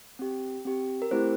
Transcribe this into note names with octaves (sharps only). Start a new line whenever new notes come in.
C4 G4
C4 G4
A#4
A3 C4 E4 G4 C5